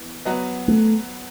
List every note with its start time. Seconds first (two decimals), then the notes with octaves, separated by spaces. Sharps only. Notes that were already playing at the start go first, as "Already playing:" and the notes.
Already playing: E3 B3
0.25 F#3 B3 F#4
0.68 A3